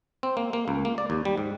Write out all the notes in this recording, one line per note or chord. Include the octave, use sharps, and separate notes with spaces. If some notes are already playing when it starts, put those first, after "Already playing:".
C4
A#3
A#3
C#2
A#3
D5
D#2
G3
G#2